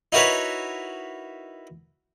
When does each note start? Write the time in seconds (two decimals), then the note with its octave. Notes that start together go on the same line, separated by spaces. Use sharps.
0.12 D#4 E4 F#4 A#4 B4 C#5